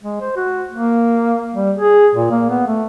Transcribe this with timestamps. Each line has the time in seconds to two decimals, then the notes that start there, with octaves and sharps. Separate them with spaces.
0.03 G#3
0.21 C5
0.36 F#4
0.72 A#3
1.55 G3
1.77 G#4
2.15 A#2
2.31 A#3
2.50 B3
2.67 A3